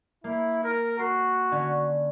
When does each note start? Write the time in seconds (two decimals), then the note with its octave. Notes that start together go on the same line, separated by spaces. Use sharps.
0.24 A#3 E4
0.64 A#4
0.99 F#4 C6
1.52 D3 C#4